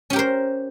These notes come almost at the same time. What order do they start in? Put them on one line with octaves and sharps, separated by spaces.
C#4 G4 A#4 C5